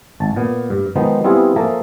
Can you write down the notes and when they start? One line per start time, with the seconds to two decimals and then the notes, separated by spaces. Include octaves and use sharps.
0.20 G#1 A5
0.36 A#2 B3
0.70 G2
0.96 D#3 F3 G#3 B3 D#4
1.24 G3 B3 C4 E4 F4 G#4
1.56 F3 A#3 G#4 A4 E5 A#5